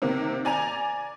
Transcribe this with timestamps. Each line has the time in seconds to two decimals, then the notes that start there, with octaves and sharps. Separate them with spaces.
0.02 C3 D#3 A#3
0.45 D5 G#5 A#5 F7